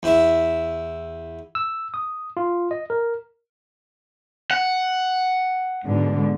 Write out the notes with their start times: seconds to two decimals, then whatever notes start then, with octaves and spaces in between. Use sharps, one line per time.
0.03 E2 E4 E5
1.55 E6
1.94 D#6
2.37 F4
2.71 D#5
2.90 A#4
4.51 F#5
5.84 G#2 B2 D3